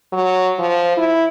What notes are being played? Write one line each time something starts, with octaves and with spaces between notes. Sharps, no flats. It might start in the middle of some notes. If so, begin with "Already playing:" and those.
F#3
F3
E4